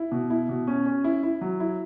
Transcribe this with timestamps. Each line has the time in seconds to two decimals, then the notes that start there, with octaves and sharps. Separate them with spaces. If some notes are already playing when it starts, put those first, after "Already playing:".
Already playing: E4
0.12 B2
0.30 E4
0.49 B2
0.67 C#4
0.86 C#4
1.04 E4
1.23 E4
1.41 F#3
1.60 E4